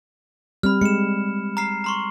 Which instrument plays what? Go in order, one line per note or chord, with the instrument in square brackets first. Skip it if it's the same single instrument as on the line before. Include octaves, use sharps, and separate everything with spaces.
[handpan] G3 C4 [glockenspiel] B5 F6
[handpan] G#3 [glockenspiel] C#7 E7
[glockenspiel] A#5 F6 C7
A#5 C6 C#6